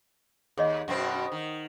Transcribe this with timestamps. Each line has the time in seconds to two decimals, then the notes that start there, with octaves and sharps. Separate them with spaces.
0.58 D#2 G#4 C#5 D#5
0.88 F#2 B2 C4
1.32 D#3